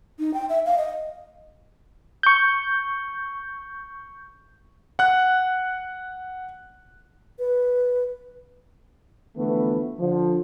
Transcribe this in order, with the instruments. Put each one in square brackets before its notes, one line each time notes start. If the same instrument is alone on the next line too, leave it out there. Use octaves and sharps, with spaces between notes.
[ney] D#4
G5
E5
F5
D#5
[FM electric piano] C#6 G6
[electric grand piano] F#5 F#6
[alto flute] B4
[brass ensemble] D3 E3 F3 A3 B3
D3 F3